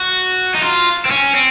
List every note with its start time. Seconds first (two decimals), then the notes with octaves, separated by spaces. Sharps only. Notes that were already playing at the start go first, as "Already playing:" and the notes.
Already playing: F#4
0.54 D#4
0.62 F4
1.05 C4
1.10 C#4
1.35 C4